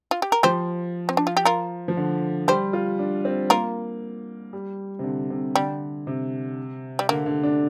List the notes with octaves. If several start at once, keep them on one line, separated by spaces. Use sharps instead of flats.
F4
G4
A#4
F3 G4 C5
C4
D4
F4
G4
F4 A#4
F3
D3
G3 G4 C5
F4
D4
C4
A#3 F4 A#4
G3
C3
D3
C3
D3 G3
C3
G3
D3 A#3
D3
D4